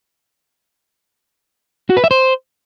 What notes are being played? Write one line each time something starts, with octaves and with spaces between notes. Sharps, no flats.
F#4
B4
E5
C5